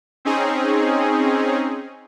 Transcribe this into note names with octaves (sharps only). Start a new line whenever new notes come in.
C4 C#4 D#4 G#4